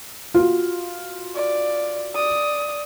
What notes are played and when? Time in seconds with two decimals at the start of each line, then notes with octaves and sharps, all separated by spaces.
0.34 F4 F#4
1.35 D5
2.15 D5 D#6